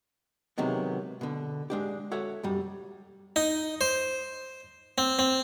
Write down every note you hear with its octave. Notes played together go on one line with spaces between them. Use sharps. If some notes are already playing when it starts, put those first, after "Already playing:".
C3 D#3 F#3 G#3 B3
B2 D3
G#3 D4 G4
F#4 A4 C#5 E5
B1 F#2 G3
D#4
C5
C4
C4